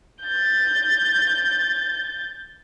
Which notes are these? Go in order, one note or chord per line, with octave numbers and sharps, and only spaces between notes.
G6 A6